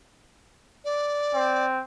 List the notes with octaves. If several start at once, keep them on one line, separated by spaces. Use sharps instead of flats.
D5
C4